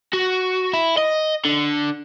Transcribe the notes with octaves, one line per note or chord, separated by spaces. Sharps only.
F#4
E4
D#5
D3